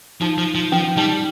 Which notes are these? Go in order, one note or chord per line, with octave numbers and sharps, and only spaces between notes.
F3 D#4
F3
F3
F3 C#4
G3 D#4